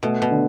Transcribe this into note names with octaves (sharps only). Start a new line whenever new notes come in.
B2 A3
B2
D3